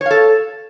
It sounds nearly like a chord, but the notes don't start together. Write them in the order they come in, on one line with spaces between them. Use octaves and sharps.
C#5 F5 A4